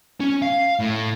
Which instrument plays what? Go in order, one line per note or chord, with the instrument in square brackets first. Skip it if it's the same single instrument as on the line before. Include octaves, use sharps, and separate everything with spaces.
[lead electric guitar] C#4
F5
A2